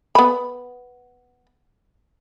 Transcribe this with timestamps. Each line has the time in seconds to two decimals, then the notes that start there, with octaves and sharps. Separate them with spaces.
0.15 B3 B5